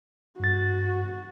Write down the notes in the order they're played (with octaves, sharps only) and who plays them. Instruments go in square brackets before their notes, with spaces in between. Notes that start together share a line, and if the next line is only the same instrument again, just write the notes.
[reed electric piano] G2 A6 [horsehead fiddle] F#4